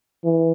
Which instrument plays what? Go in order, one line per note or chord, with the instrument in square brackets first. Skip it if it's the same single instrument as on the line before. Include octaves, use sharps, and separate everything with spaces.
[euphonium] E3